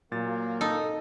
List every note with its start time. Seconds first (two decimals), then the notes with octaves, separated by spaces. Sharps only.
0.12 A#2 F#3 A#3 A6
0.61 D#4 A4